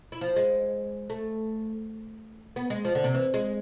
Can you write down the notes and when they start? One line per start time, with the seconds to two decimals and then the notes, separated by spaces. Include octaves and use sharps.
0.12 E4
0.21 F3
0.36 G#3
1.10 A3
2.56 B3
2.70 G#3
2.85 F3
2.95 D3
3.04 C3
3.14 E3
3.34 G#3